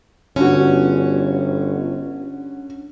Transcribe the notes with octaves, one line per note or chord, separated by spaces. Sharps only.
G1 D3 C#4 F#4